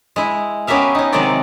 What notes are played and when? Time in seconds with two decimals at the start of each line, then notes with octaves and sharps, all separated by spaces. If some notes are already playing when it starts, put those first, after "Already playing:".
0.16 G#3 E4
0.67 B3 C#4 G4 A#4 E5 F5
0.95 C#4 D#4
1.13 C3 D#3 F#3 G#3 C4 D5